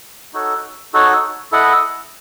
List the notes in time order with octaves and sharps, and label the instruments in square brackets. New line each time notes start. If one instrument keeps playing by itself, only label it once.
[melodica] D#4 F#4 A4 C#5
D#4 F#4 A4 C#5
E4 A4 D#5 F#5